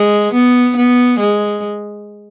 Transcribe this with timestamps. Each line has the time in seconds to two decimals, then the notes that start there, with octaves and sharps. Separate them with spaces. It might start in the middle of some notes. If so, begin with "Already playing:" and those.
Already playing: G#3
0.33 B3
0.76 B3
1.19 G#3